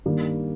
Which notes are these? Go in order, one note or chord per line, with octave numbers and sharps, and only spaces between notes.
G2 D#3 G3 A#3